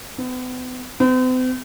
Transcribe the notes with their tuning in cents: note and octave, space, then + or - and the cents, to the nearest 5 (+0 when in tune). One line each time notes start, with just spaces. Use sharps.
B3 +40
C4 -45